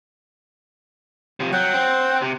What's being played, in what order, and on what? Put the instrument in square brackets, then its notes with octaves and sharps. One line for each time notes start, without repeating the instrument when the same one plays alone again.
[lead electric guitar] C3 F3
[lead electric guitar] F#3 [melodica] F#5 G5
[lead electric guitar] C4
C3